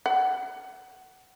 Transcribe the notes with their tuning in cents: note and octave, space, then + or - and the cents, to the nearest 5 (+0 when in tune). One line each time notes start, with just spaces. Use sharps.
F#5 +20